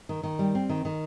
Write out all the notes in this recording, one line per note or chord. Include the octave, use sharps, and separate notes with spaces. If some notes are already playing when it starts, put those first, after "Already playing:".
D#3
D#3
G3
C4
D#3
D#3